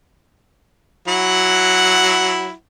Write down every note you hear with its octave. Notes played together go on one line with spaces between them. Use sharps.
F#3 E4 F#5